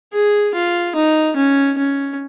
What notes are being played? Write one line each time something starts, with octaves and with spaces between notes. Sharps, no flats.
G#4
F4
D#4
C#4
C#4